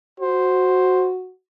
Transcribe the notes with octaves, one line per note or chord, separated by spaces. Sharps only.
F#4 C5